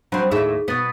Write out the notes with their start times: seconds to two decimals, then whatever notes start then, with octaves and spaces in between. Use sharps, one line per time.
0.12 F#3 C4 D4 C5 B5
0.31 D#2 A2 D#4 G#4 E5
0.68 B2 B3 D#6 A6 B6